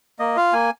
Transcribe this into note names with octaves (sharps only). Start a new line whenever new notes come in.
A#3 D#5
F4 F5
A#3 G#5